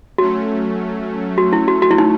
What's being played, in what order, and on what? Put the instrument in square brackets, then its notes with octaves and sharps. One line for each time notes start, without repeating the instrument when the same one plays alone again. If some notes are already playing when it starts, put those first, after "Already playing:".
[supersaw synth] F#3 A3 C#4 [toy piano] F#4
[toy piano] F#4
E4
F#4
F#4
E4
D#4